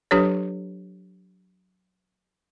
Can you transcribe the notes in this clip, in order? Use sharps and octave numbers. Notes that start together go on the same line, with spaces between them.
F#3 D4 G4 A4 B4 C#5